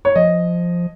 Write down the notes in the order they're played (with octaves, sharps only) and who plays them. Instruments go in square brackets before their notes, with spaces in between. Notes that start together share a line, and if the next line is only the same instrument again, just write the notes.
[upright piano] C#5
[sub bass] F3 [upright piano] D#5